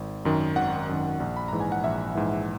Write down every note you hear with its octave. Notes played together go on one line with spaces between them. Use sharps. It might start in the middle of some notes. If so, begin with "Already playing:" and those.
Already playing: G#1
F#2 D#3
G#1 F#5
F#2 D#3
A#1
B5
G#2 E3 A#5
G#5
F#5
A#1 E5
G#2 E3